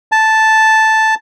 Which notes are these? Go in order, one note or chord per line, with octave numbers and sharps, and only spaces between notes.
A5